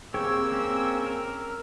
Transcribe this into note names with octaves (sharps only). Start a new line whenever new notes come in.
A#3 C4 G4 G#4 C#5 E6
C4 C#4
A#4